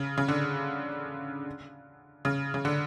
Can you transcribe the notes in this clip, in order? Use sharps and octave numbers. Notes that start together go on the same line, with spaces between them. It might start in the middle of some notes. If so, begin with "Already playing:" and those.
Already playing: C#3
C#3
D3
C#3
C#3
D3